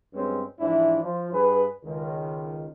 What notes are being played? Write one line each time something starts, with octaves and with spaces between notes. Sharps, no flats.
G2 F#3 G#3 C4 C#4
G#2 E3 F3 D4 E4
F3
G2 G#4 B4
C#2 D#3